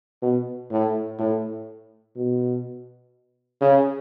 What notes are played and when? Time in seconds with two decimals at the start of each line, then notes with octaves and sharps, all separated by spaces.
0.22 B2
0.71 A2
1.19 A2
2.16 B2
3.61 C#3